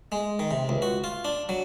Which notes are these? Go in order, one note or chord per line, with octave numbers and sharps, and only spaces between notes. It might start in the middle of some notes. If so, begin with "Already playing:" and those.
G#3
D#3
C3
C#2
F#4
F4
D4
F#3